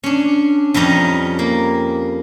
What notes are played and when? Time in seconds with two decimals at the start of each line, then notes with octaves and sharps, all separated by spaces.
0.04 C#4 D4
0.74 F2 G3 C#4 D#5 A#5
1.39 A#3